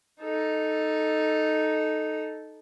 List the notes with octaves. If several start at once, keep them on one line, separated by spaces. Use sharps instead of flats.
D#4 A4